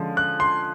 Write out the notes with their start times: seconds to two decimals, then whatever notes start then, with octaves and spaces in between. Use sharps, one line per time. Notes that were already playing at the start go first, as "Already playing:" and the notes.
Already playing: D3 F3 G#3 C#4
0.17 F#6
0.40 C6